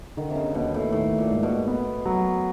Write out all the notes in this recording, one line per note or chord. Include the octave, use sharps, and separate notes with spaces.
D3 D#3
C3
C#3
D#2 B2
A2
A2 D#3
A#2
G#2
B2
B3
F#3